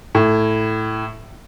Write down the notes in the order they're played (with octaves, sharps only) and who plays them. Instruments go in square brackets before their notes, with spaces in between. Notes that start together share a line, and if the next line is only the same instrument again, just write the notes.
[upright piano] A2